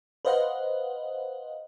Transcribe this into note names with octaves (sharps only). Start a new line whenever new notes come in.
B4 C5 D#5 F5 F#5